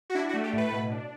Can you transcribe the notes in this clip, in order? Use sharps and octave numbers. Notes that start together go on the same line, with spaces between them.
F#4
D4 E4
F#4
A3
G4
A2 B4
B2
D4